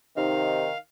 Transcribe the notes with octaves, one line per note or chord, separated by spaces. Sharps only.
C3 D#3 D#4 F5